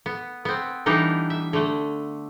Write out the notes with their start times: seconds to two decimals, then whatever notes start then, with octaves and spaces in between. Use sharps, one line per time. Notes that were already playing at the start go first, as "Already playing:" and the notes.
0.06 B3
0.45 B3 C4
0.86 E3 G3 B3 D4 D#4
1.30 E5
1.53 D3 A3